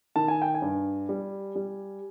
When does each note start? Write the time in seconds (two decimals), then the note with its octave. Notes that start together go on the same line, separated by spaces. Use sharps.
0.16 D#3 A5
0.28 G#5
0.42 G5
0.55 G#5
0.62 G2
1.09 G3
1.56 G3